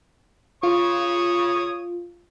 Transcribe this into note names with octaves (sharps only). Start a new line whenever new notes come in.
F4 C#5 C#6 D#6